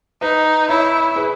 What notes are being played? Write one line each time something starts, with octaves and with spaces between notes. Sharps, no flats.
D#4 B4 D#5
E4 C#5 E5
G#4 B4